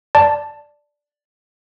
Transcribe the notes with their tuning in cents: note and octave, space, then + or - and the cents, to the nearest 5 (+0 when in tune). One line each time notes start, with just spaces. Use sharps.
D5 +0 A5 +0